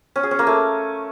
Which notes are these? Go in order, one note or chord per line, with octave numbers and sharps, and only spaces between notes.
C#4
G#4
C#4
A#3
A3